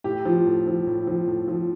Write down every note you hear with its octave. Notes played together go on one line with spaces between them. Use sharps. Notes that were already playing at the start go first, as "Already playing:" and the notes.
A2 G4
F3
A2
F3
A2
F3
A2
F3